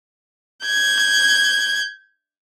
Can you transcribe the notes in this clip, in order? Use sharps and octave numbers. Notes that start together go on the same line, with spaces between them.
G6 G#6